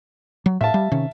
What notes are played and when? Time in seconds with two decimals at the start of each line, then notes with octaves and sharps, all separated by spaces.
0.46 F#3
0.61 A2 E5 F5 A5
0.74 G3
0.92 C3 D#3 C#4